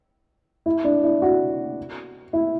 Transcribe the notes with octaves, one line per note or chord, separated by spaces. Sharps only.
E4
D4
E4
F#4
E4